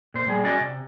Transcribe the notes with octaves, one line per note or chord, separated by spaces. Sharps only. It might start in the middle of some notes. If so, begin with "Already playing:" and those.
A#2 C5
A#2 G3 G#4
C#4 F#4 D5 D#5
C3